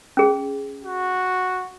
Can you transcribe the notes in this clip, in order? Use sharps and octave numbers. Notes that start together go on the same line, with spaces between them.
C#4 G#4
F#4